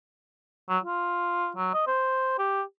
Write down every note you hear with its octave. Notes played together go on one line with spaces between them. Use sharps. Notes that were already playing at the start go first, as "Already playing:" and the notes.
F#3
F4
F#3
D#5
C5
G4